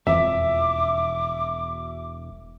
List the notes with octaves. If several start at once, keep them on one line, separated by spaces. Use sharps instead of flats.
E1 F2 E3 E5 D6